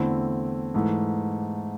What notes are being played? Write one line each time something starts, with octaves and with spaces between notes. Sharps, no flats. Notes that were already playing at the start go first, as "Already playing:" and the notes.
Already playing: E2 D3 A3 C4 E4
G#2 E3 A3